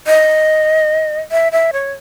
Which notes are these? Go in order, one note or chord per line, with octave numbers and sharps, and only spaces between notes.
D#5
E5
E5
C#5